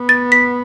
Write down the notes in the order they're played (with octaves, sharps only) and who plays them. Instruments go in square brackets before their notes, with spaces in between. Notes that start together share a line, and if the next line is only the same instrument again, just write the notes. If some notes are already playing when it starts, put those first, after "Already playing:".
Already playing: [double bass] B3
[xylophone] A6
B6